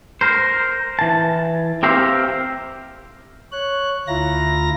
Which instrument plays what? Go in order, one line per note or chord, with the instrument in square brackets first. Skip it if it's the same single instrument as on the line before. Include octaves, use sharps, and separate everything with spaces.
[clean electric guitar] A#4 C5
E3 A5
C4 G4 A#4 C5 E5 F5
[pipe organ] C#5 F#6
D2 E4 F4 A#5 A#6